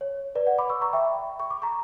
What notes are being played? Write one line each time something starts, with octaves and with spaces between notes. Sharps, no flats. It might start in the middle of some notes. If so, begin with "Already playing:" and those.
C#5
B4 D5
D5 F#5
B5 D6
C#6 E6
A#5 C#6
E5 G5
G5 B5
C#6
D6
A#5 C#6